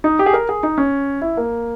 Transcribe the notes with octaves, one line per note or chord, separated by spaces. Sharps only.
D#4
G4
G#4
A#4
G#4
D#4
C#4
E4
A#3